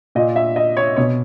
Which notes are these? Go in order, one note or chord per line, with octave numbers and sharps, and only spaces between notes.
A#2 D#5
E5
D#5
C#5
B2 C#5